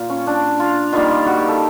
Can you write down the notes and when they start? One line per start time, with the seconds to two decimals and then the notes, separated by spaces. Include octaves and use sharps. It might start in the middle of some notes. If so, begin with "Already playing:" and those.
Already playing: A#2 A#3 F4
0.10 C#4
0.27 D4
0.60 F4
0.93 D#3 G3 A#3 F4
1.26 F#4
1.37 G4
1.48 A4